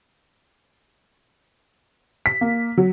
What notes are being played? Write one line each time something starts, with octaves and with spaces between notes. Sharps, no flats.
B6
A#3
F#3